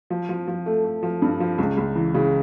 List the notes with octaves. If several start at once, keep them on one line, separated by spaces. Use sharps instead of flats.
F3
F3
F3
A3
A3
F3
G2
F3
C#2
C#2
E3
C#3